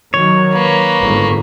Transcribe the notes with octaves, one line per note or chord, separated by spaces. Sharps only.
D#3 F#3 C#5
A#3 B4
G1 G#2